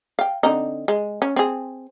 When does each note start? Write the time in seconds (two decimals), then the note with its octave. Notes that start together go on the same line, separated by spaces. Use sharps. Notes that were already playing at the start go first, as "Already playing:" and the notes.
0.19 F5 G5
0.43 D3 C4 D#4
0.88 G#3
1.22 C#4
1.36 C4 G#4